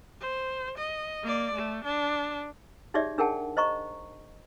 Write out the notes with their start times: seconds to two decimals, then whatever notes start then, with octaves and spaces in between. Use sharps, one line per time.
0.21 C5
0.78 D#5
1.24 A#3 D5
1.55 A3
1.85 D4
2.94 D#4 G4 G#4 C#5 D5 E5
3.18 D4 G#4 A#4 F#5 G5 A5
3.57 C5 D#5 A#5 C#6